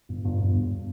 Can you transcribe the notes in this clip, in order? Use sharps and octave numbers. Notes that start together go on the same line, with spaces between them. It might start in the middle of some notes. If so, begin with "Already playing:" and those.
G1
G1
G1
G1